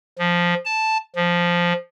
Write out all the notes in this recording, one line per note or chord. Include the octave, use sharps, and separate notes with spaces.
F3
A5
F3